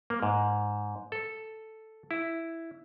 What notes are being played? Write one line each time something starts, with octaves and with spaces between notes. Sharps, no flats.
A#3
G#2
A4
E4